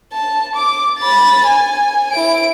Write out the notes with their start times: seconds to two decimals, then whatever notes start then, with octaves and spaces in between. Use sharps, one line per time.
0.13 A5
0.56 D6
0.99 B5 A6
1.46 G#5
2.12 E4 D7